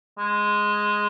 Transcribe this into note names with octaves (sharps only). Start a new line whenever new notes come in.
G#3